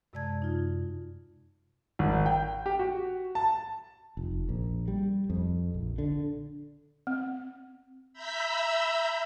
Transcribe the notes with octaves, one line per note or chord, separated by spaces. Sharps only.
F#2 C3 G#3 D5 A5 G#6
D#4 F4
G#1
G5
G4
F#4
A5
F1
A#1
G3
F2
A#1
D3
C4
E5 A#5 B5 E6 G6 B6